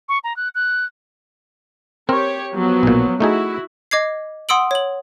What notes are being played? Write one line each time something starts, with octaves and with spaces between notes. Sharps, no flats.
C#6
A#5
F#6
F#6
C4 G4 A#4 C#5
F3 F#3 B3
B1 A#2
A3 D#4 E4 F#4 G#4
D#5 D6 G#6 C7
F#5 C6 D#6 E6 D7 F#7
C#5 F#7